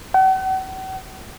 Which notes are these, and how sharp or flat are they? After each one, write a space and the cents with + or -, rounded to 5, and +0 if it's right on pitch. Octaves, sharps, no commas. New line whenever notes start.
F#5 +45